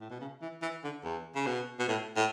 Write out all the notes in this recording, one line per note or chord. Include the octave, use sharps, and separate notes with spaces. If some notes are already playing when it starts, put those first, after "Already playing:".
A2
B2
C#3
E3
E3
D3
E2
C#3
B2
B2
A2
A2